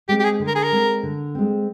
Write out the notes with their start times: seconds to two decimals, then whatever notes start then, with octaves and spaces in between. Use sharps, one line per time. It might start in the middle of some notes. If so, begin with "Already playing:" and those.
0.09 G#3 C4 G4
0.20 G4
0.24 G#4
0.40 D3
0.48 A#4
0.55 G#4
0.63 A#4
0.72 G#3 C4
1.03 D3
1.35 G#3 C4